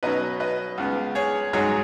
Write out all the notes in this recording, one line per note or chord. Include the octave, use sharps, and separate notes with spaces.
B2 F#3 C#4 B4 D#5
B4 D#5
C#2 C#3 B3
G#4 C#5
G#2 F#3 D#4 G#4 C#5